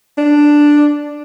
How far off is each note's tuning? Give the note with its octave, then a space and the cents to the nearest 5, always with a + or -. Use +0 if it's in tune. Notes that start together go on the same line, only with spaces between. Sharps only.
D4 +5